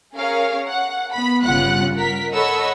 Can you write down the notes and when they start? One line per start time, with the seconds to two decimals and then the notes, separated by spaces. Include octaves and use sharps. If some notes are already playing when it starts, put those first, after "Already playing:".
0.15 C#4 G#4 A#4 C#5 F5
0.67 F#5
1.13 B3 B5
1.44 G1 C#3 G3 F4 F#5 F#6
1.97 A#4 B6
2.32 A4 C#5 D#5 F#5 B5 E6